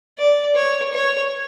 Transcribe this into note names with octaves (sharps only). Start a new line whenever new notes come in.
D5
C#5
C#5